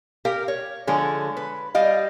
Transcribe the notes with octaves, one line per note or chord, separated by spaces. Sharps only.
G4 A#4 F5
C#5
D3 F3 G#3 C#5
B4
G3 D#5 F5